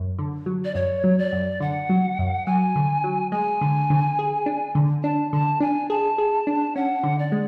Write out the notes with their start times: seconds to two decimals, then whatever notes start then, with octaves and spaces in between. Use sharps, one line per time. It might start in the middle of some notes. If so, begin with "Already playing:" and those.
Already playing: F#2
0.19 D3
0.46 F#3
0.65 D5
0.75 F#2 C#5
1.04 F#3
1.19 D5
1.32 F#2
1.60 D3 F#5
1.89 F#3
2.19 F#2
2.46 F#3 G#5
2.76 D3
3.04 F#3
3.32 G#3 G#5
3.61 D3
3.90 D3
4.19 G#4
4.46 D4
4.75 D3
5.03 D4 A5
5.33 D3 A5
5.60 D4 G#5
5.89 G#4 A5
6.18 G#4
6.47 D4
6.76 C#4 F#5
7.03 D3
7.19 D5
7.32 G#3